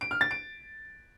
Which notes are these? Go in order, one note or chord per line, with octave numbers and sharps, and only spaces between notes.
D7
F6
A6
D7